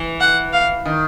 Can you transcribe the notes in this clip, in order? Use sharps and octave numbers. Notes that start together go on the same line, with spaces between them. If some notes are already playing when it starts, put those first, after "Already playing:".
Already playing: E3
F#5
F5
D#3